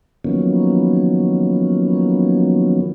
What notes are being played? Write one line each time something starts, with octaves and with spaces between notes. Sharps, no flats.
D#3 F3 F#3 A#3 B3 C#4